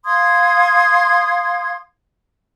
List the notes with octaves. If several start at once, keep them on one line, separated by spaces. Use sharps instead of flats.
F5 C6 D#6 G#6